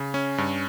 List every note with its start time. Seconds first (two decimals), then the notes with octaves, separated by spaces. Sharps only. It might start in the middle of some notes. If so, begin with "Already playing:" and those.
Already playing: C#3
0.14 C#4
0.38 G2